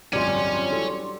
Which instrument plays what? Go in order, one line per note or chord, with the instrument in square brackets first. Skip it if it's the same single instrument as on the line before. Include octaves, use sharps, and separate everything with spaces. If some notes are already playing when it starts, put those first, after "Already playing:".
[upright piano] G#1 C#2 F#2 [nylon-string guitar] G3 [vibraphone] D4 C6 [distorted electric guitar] C#5 G#5
[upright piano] E3 F#3 A4